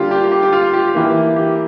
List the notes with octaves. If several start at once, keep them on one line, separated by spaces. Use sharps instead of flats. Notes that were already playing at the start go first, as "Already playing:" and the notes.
Already playing: D3 G3 A#3 F4 G4
G4
G4
G4
F4
G4
E3 A#3 G4
G4